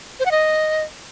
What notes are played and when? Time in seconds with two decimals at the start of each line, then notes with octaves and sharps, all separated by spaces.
0.20 C5
0.25 F#5
0.31 D#5